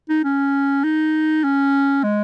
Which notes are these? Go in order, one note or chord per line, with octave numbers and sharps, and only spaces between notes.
D#4
C#4
D#4
C#4
G#3